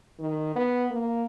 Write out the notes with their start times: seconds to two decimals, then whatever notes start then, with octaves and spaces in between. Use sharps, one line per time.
0.20 D#3
0.56 B3
0.90 A#3